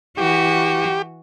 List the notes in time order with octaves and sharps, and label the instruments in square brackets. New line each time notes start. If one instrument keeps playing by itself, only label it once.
[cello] E3 F#4 [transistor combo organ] G4